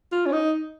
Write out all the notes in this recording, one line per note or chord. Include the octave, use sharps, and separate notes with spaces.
F4
C#4
D#4